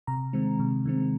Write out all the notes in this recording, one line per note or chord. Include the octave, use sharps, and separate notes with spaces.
C3 A#5
D#3 G#3 C4
C3
D#3 G#3 C4